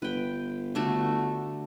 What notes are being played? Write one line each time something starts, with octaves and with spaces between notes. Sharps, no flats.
G1 B4 G5
D3 A3 F#4